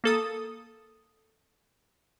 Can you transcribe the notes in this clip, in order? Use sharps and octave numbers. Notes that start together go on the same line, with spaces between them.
A#3 A4 D#6